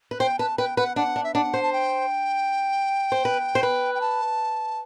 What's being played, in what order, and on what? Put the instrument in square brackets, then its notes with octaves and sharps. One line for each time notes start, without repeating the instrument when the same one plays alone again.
[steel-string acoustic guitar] B4
[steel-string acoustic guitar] C5 [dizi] G5
[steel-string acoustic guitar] B4 [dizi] A5
[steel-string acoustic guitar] B4 [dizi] G5
[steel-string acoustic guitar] B4 [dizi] F#5
[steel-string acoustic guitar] D4 [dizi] F#5
[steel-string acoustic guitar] D4
[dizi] E5
[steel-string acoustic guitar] D4 [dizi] F#5
[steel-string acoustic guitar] C5
[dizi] A5
G5
[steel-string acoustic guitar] C5
B4
C5
B4
[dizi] G5
A5